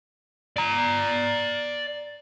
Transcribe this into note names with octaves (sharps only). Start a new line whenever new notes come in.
D5 A#5